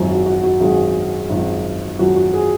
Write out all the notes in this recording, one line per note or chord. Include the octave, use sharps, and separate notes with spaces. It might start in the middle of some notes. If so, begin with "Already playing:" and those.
Already playing: G#1 F#2 F3
F#4
F#4
F#4
G#1 F#2 F3 G#4
G#1 F#2 F3
G#1 F#2 F3 F#4
F#4
G#4